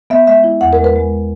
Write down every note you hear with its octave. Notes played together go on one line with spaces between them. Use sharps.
B3 E5
G#3 E5
E4
E2 F#5
A#4
G#3
B4
G#3